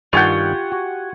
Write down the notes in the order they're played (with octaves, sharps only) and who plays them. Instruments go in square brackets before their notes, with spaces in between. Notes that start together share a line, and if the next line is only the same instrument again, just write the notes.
[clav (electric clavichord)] G2 D#3 G3 [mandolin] F4 G4 [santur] F#5 G#5 C#6
[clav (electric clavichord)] F#4